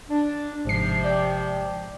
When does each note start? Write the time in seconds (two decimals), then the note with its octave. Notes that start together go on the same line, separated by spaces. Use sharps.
0.09 D4
0.65 G#1 G#2 C3 F3 C7
1.04 D5 G5